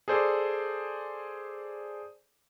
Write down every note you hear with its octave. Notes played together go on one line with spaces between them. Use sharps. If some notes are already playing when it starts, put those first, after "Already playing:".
G#4 A4 C5 D5